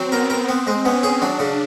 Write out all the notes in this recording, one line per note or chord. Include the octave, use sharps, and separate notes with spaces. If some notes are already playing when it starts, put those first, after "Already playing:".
Already playing: F#3 C4
B3 A#4
A#4
B3 C4
G#3
B3 C#4
G#4
F#3 D4
C#3